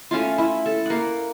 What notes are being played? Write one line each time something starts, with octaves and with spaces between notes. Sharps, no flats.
A3 C#4 E4 F4
E4
A4
A#3 F#5